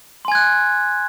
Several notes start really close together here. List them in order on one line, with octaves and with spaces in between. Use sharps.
C6 G#5 G#6 F#6